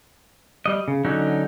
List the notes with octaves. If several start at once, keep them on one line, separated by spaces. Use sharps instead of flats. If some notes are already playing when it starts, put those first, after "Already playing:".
G3 D#5
C#3
D3 F#3 C#4 D#4